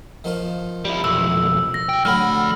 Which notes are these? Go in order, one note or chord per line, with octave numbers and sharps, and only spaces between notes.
D#3 F3 F4
G3 E4
B1 F2 E6
A#6
C3 G5
F2 A2 D3 F#3 B5 F6